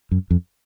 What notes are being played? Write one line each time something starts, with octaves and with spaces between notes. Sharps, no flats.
F#2
F2